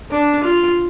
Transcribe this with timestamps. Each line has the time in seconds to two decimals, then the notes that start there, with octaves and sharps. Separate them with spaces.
0.11 D4
0.44 F4